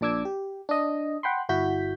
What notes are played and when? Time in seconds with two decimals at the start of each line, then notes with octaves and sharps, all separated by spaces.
0.01 A#1 A#2 D4 D6 E6 G#6
0.25 G4
0.69 D4 D#5
1.23 F#5 G5 B5 C6
1.49 G1 E4 F#4 G6 B6